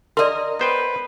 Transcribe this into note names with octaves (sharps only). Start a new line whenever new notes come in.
A#4 D5 D#5 C6
B3 B4 C5 G5